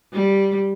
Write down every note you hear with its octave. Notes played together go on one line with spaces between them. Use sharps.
G3